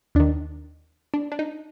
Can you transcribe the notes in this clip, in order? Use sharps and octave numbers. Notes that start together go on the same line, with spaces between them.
D#2 D#3 D4
D4
D4
D#4